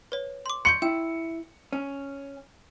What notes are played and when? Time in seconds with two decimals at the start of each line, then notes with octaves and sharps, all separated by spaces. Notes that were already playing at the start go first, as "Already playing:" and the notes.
0.12 B4 C#5
0.46 C6 D6
0.65 C6 C#6 G6 C#7
0.82 E4 G5
1.73 C#4